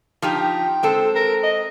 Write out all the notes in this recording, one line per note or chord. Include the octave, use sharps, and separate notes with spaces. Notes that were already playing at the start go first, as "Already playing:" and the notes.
F3 D#4 G4
G5
G#3 C4 A4
A#4
D#5